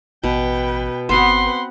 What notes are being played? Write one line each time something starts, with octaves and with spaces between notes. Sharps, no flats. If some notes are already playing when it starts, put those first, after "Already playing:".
A1 B2 B4 G5
G1 B3 C4 F#4 B4 F#5 C6